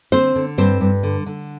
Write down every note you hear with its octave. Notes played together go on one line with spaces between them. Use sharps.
D3 C4 C5
D3
G2 C4 C5
G2
D3
D3